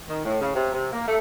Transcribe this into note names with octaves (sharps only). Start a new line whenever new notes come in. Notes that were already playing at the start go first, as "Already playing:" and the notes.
D#3
A2
C#3
C3
C3
A#3
A3